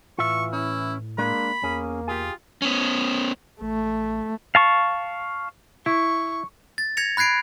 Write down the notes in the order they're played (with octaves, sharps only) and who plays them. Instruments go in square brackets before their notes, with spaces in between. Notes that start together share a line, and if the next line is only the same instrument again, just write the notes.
[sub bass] A2 [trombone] E3 [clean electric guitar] F4 E5 [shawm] C#6
[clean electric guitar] C#4 [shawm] E4
[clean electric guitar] G#3 D4 [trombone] A#3 [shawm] B5
[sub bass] E2 [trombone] A#3 [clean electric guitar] C#4 G#4
[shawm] F4 [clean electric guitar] G4 G#4
[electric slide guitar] B3 C#4
[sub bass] A1 [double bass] A3
[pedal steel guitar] F5 A5 C#6
[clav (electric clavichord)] E4 [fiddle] C#6
[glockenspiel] A6
G#6 A#6 C#7 F7
B5 F#6 G#6 C7 D7